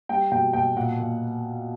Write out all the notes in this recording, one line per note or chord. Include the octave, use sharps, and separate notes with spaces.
G3 G5
B2 G5
B2 G5
A#2 F#5
A#2